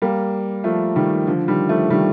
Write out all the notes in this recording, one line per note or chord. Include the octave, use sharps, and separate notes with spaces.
G3 A#3
F3 A3
D#3 G3
D3 F3
D#3 G3
F3 A3
D#3 G3